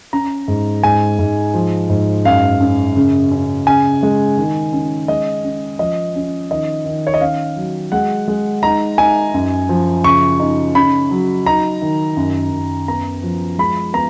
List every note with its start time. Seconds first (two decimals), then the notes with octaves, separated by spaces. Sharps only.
0.13 C#4 A#5
0.48 G#2
0.83 G#2 G#5
1.19 G#2
1.54 F3
1.90 G#2
2.25 F#2 F5
2.61 C#4
2.96 C#3
3.32 C#4
3.67 C#3 G#5
4.03 G#3
4.38 D#3
4.73 C#4
5.08 G#3 D#5
5.44 C#4
5.79 F3 D#5
6.15 C#4
6.51 D#3 D#5
6.86 D#3
7.07 C#5
7.14 D#5
7.21 C#4 F5
7.56 F#3
7.92 G#3 F#5
8.28 G#3
8.63 D#4 A#5
8.98 D#4 G#5
9.34 F#2
9.69 F3
10.04 C#3 C#6
10.40 D#4
10.75 C#4 B5
11.11 F#3
11.46 D#4 A#5
11.82 D#3
12.17 F#2
12.52 F#2
12.88 B3 A#5
13.23 F3
13.58 G#3 B5
13.94 B3 A#5